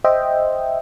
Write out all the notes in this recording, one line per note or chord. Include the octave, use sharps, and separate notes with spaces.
C5 D#5 E5 G5